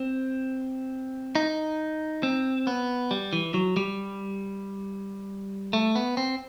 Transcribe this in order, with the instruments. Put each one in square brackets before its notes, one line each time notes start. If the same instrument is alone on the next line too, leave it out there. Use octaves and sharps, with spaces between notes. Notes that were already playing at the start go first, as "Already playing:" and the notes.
Already playing: [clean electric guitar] C4
D#4
C4
B3
G3
E3
F#3
G3
A3
B3
C4